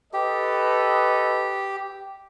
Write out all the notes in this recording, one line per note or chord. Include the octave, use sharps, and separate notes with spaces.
G4 A4 B4 D#5